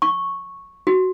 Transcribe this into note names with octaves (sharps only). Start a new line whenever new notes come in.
C#6
F#4